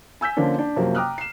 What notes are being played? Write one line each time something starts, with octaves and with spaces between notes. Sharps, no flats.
G#5 E6 G6 B6
D3 F3 A#3 C#4 D4
D4
F#2 C3 F3 A#3
G5 A#5 D6 D#6 F6 F#6
C7 E7